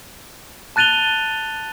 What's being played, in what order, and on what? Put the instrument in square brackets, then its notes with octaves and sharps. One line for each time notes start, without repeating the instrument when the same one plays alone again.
[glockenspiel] A5 F#6 A6 D#7 F7 G7